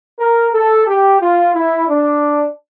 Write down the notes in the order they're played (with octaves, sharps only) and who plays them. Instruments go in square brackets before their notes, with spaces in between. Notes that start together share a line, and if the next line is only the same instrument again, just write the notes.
[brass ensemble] A#4
A4
G4
F4
E4
D4